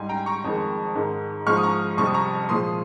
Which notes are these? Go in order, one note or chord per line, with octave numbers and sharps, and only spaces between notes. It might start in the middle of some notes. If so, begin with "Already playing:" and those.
Already playing: G#2 G3 G#5 C6
G5 A#5
A#5 C#6
F2 D#3 G#3
G#2 D#3 G#3
G#2 F3 G#3 C#6 F6
D#6
A#5 C#6
F2 C3 G3 C#6
D#6
A#5 C#6
A#2 F3 G#3 C6 D#6